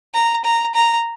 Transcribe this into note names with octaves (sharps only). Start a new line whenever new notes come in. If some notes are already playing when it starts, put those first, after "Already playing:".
A#5
A#5
A#5